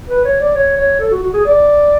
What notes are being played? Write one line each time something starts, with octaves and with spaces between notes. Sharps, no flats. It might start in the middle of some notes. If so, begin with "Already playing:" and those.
B4
C#5
D5
C#5
C#5
A4
F#4
F#4
G#4
D5